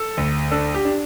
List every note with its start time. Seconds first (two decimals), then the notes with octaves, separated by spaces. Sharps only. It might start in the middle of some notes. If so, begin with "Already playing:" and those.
Already playing: A4
0.17 D2
0.52 D4 A4
0.74 G4
0.85 D4